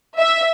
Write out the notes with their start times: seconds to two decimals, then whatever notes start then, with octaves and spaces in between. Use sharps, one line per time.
0.17 E5